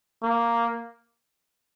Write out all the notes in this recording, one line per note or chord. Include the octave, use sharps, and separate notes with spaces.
A#3